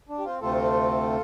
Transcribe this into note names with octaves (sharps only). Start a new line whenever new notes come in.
D4
G4
C4 F4
D2 C3 A3 C4 F4 A4